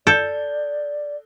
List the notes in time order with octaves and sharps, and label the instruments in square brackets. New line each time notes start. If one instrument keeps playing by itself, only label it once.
[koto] A4 [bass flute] D5 [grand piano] G6